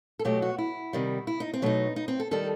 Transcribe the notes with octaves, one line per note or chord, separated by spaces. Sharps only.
A4
B2 F#3 A3 G4
F#4
E4
C3 D#3 G3
E4
D#4
C4
B2 F#3 A3 D#4
D#4
C4
A4
D#3 G3 A4